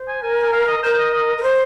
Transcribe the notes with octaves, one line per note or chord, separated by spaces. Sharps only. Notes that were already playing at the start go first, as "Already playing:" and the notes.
Already playing: C5
G#5
A#4 G#5
G#5
F5
D#5
A#4 C5
C5
D#5
D#5
A#4
C5